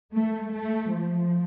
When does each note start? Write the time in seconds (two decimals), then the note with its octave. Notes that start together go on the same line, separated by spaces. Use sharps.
0.13 A3
0.53 A3
0.92 F3